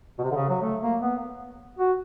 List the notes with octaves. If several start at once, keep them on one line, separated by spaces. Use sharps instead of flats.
B2
C3
D3
C#3
F#3
A3
A#3
B3
F#4